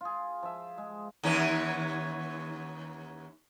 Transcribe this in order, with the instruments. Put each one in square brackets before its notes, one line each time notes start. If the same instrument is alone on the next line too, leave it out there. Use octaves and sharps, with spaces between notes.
[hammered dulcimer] F4 G#4
F3 E5
G#3
[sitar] D#2 E3 C#4